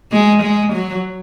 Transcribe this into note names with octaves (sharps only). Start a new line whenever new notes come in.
G#3
G#3
F#3